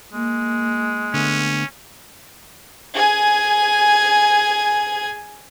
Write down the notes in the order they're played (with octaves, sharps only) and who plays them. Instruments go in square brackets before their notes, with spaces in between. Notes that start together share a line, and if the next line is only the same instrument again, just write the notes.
[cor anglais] G#3 [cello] A#3
[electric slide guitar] D3 A3 B3 [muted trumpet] C#4
[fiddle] G#4 G#5